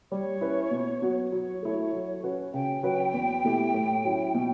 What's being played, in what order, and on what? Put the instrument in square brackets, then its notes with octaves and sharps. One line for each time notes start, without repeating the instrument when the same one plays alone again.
[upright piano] G3 [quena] C#5
[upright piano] C#4 E4 B4
B2
F#3 B3 F#4
[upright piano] F#3 [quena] C#5
[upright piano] A3 E4 A4
F#3
C#4 F#4 B4
[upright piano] C#3 [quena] G5
[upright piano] F#3 C#4 F#4 B4
E2
B2 A3 E4 G4
A2
F#3 C#4 E4
B2